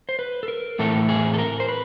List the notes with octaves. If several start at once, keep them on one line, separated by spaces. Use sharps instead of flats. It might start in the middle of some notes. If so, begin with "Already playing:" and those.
C5
B4
A4
A#4
A2 E3 A3 C4 A4
G#4
A4
A#4
C5
B4